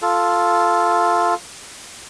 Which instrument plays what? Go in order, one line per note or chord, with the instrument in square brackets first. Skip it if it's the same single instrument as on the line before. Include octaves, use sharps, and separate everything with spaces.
[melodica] F4 A4